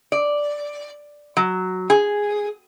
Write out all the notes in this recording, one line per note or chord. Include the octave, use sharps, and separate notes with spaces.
D5
F#3
G#4